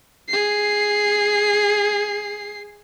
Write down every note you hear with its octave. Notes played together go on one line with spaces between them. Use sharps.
G#4 C7